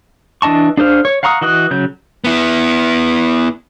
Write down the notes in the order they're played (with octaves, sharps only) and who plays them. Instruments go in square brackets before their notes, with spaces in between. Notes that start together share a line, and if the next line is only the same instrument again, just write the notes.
[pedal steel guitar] E3 D4 D#5 A5 C#6
D4 G#4 C5 F5
C#5
F5 F#5 A#5 C#6 D#6
E3 F#4 D#5 D#6 F#6
C#3 F#3 G6
[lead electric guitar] B3 E4